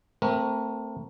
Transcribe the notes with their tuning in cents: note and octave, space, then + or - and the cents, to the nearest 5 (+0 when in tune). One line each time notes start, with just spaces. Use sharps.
A3 +30 C4 +0 A#4 +30